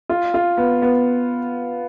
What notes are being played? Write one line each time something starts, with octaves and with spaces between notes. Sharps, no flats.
F4
F4
B3
B3